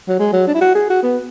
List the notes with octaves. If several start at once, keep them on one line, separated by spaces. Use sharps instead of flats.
F#3
G#3
F#3
D4
E4
F#4
G#4
F#4
B3